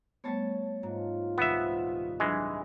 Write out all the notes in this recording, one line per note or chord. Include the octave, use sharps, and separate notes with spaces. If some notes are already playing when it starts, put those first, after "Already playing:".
G3 A3 B3 C#5 A5 A6
G#2 F4 A#5
D#1 C2 B3 E5 D#6
E3 F#3 G#3 D4 D#5